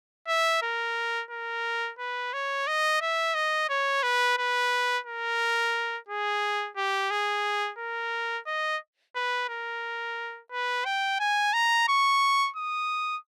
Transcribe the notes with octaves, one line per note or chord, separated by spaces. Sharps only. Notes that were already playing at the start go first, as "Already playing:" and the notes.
E5
A#4
A#4
B4
C#5
D#5
E5
D#5
C#5
B4
B4
A#4
G#4
G4
G#4
A#4
D#5
B4
A#4
B4
G5
G#5
A#5
C#6
D#6